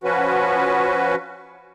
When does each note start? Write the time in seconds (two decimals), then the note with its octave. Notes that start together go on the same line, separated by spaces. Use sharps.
0.04 F3 C#4 F#4 B4